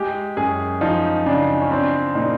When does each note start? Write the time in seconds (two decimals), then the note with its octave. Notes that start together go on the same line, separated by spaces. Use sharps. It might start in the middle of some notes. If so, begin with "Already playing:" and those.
Already playing: G#3 G4
0.37 F#2 G#4
0.81 F3 D#4
1.26 C#3 D4
1.61 C#4
1.71 C4 D4
2.15 A#2 D#4